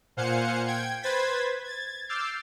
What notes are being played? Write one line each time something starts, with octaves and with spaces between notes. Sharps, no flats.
A#2 C5 F5 F#5 G#5 C#7
G5 G#6
B4 C5 G#6 A6 B6
G#6 A6
D6 E6 F6 G6 A6 C7